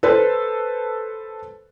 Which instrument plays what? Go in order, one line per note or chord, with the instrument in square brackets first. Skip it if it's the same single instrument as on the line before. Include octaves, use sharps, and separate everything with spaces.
[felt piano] A4 B4 C5